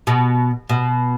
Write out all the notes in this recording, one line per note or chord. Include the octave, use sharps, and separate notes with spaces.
B2
B2